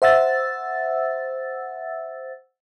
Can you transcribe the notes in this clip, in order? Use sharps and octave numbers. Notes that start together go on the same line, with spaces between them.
C5 E5 F#5 E6 A6